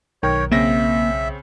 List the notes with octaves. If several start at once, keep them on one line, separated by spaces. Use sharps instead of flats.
B1 D#3 A#4 C#5 G5
C#3 A#3 C4 E5 A#6